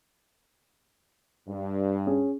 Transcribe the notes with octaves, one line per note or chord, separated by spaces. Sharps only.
G2
C#4 G#4